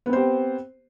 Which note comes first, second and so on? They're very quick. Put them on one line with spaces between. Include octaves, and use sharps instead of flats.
B3 C4 C5 G4